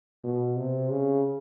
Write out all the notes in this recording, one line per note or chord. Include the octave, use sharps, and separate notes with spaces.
B2
C3
C#3